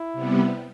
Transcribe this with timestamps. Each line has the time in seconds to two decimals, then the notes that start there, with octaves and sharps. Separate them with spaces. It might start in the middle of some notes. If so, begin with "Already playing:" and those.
Already playing: E4
0.13 C3 G3 B3